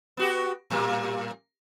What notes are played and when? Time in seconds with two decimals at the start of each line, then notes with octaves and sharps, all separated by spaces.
0.17 B3 F#4 G4
0.70 A2 G3 A#3